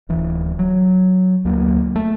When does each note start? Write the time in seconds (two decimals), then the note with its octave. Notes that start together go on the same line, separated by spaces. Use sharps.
0.09 D1 E3
0.59 F#3
1.45 D2 F#3 A#3
1.96 A3